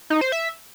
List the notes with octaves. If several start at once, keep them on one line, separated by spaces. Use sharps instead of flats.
D#4
C5
E5